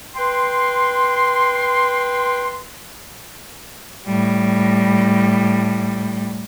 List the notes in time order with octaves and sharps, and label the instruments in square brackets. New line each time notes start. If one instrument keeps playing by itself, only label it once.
[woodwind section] B4 G5 C6
[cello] A2 G3